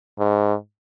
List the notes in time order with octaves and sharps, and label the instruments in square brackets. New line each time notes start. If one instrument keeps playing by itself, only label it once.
[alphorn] G#2